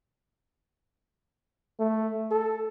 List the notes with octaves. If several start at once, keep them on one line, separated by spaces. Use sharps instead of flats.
A3
A4